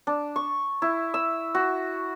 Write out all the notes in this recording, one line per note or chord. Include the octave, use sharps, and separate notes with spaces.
D4
C#6
E4
E6
F#4